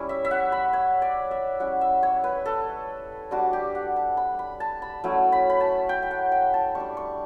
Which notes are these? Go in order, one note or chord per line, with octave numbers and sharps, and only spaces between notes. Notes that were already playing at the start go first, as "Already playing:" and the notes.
Already playing: G3 C#4 E4
E5
E5
F#5
B5
C#5
D5
E5
G3 C#4 E4 F#5
E5
C#5
B4
A4
G3 D4 F#4
G4
F#5
A5
B5
B5
A5
B5
F#3 A3 C#4 E4
B5
B5
A5
G5
G5
F#5
G5
A5
G3 C#6
D4
C#6